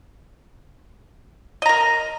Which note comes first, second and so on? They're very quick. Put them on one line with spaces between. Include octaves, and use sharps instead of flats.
D#5 A#5 A#4